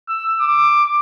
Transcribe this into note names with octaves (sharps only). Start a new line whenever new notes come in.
E6
D6